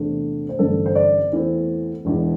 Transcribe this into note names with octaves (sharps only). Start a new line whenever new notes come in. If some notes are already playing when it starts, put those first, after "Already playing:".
Already playing: E2 C3 A3 D4
C5
A1 G2 D3 G3 C4 A4
C5
D5
E2 E3 A3 C4
E1 E2 E3